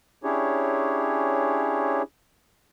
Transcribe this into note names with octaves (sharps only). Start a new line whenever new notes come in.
C#4 D4 E4 G4 G#4 C#5